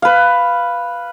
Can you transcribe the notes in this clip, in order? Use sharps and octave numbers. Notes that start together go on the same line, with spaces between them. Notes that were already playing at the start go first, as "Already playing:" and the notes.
B4 F5